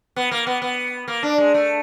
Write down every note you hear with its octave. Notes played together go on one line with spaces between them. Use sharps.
B3
A#3
B3
B3
A#3
D4
G#3
A3